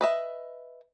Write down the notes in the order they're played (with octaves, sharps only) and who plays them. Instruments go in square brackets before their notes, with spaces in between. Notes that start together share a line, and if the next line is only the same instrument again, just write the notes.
[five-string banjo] B4 D#5 E5